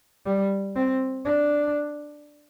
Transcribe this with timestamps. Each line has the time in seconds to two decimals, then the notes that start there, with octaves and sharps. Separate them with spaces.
0.26 G3
0.75 C4
1.25 D4